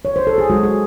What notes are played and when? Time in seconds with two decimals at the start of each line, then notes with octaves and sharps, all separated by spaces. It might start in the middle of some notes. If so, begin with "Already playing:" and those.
0.05 C#5
0.16 C5
0.27 A4
0.38 G#4
0.50 G#3 F#4
0.63 G#4